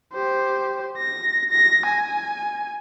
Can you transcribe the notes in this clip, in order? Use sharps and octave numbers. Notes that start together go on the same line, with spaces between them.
G4 C5
A#6
A#6
G#5